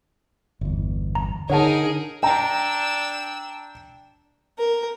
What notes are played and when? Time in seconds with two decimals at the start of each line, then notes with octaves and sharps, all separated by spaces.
0.61 G1 E2
1.15 A#5
1.50 D3 D#4 G#4 A#4 C#5 F#5 A5
2.23 D4 G5 A#5 E6
4.58 A#4